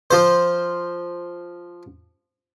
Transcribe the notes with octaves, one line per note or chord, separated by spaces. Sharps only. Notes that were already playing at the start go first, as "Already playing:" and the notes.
F3 C5